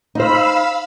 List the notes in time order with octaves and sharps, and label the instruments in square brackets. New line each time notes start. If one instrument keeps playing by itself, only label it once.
[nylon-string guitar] D#4 C5 [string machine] F5 B5 E6